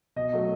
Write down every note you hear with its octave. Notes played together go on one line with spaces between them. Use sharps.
B2 D#5
F#3 A3